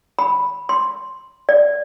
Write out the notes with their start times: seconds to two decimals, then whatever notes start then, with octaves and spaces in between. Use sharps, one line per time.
0.19 B5
0.69 C6
1.49 D5